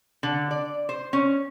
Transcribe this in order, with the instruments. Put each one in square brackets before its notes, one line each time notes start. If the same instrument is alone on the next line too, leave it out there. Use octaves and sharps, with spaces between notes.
[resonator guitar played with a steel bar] D3
D5
C5
C#4